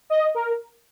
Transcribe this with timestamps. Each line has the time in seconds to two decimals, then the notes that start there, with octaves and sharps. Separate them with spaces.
0.10 D#5
0.35 A#4